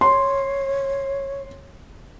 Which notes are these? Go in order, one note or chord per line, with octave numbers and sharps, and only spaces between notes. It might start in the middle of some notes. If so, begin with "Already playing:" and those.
C#5 C6